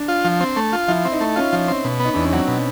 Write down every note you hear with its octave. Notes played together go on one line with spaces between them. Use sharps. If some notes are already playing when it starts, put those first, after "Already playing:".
Already playing: D4
F4
F3
C4
A3
F4
F3 E4
C4
D#4
A3
C#4 F4
F3
C4
B2
B3
D#4
E2 D4
C#4
F#3 C4
B2